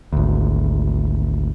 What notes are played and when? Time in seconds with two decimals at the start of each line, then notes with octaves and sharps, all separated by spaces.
0.13 G#1 D2